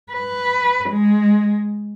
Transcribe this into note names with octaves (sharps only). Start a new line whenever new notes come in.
B4
G#3